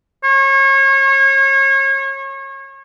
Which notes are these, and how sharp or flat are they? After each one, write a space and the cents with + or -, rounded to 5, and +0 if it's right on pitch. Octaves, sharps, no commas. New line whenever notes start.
C#5 -30